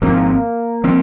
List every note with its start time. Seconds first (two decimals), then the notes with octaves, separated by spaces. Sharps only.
0.02 G#1 G#2 F3 A#3 C4
0.84 F3 C4